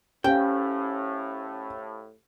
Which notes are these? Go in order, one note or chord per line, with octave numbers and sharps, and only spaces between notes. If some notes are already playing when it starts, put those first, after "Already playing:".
A2 C#4 G4 C5 F5 G5